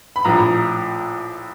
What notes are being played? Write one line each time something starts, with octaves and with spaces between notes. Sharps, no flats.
B5
A#1 A2 F3 A#5